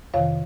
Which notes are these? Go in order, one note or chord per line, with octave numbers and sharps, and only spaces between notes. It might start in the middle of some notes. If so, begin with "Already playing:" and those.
F2 C3 D#3 C#5 F5